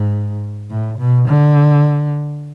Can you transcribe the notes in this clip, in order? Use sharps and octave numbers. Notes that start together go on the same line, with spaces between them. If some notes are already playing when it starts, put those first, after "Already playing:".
Already playing: G#2
A2
B2
D3